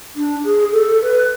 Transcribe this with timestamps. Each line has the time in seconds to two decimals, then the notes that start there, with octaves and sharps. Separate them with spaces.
0.16 D4
0.44 G#4
0.72 A4
1.02 B4